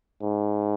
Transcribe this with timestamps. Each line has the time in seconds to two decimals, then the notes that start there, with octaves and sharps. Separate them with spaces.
0.22 G#2